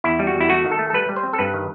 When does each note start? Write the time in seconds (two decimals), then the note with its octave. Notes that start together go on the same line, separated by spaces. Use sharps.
0.04 E2 E4
0.19 G3
0.27 F#4
0.35 E2
0.41 E4
0.49 A3 F#4
0.65 D#3
0.71 A4
0.79 A3
0.90 A4
0.93 G3 B4
1.09 G3
1.16 C5
1.23 C4
1.33 A4
1.39 G2 B4
1.54 D#3